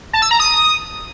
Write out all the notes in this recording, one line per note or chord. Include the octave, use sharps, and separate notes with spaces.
A5
E6
A#5
D#6